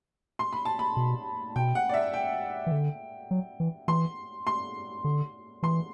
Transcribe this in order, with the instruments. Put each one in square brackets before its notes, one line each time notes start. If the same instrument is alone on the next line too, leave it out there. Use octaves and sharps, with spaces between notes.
[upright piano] C6
B5
A5
B5
[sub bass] B2
[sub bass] B2 [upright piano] G5
[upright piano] F#5
D5
E5
G5
[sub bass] E3
D3
F#3
E3
[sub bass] E3 [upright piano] C6
[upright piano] C6
[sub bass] D3
[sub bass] E3 [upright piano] C6